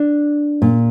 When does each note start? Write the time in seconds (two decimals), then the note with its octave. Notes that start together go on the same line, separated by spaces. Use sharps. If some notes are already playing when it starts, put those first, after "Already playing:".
Already playing: D4
0.62 A#2